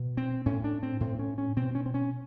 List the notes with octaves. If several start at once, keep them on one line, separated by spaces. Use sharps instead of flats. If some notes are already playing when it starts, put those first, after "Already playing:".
Already playing: B2
C4
A2 C#4
D4
C4
A2 C4
C#4
C#4
B2 C4
C#4
C4
C#4